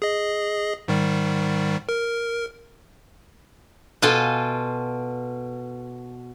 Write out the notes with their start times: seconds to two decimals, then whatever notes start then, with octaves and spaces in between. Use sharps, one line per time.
0.02 G#4 D#5
0.88 G#2 D#3 G3
1.89 A#4
4.02 B2 F4 A4 G#5